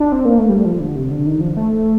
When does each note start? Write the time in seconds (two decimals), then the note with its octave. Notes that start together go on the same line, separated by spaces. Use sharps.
0.00 D4
0.12 C4
0.25 A#3
0.38 A3
0.49 G3
0.65 F3
0.80 D3
0.96 C3
1.11 D3
1.26 D#3
1.41 F3
1.57 A3